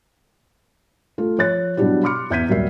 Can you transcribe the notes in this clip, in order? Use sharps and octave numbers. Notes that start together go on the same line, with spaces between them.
A3 F4
F3 C#5 F#6 A6
B2 F#3 G3 D4 E4 G4
B5 C6 D6 F6 C#7
E2 E5 G6 G#6 B6 D#7
D#1 F#3 G3 A#4 E5 C7